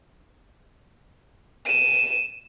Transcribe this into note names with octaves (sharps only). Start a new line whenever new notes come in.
D#7 E7